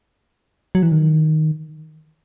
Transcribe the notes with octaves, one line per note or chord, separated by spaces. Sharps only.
F#3
E3
D#3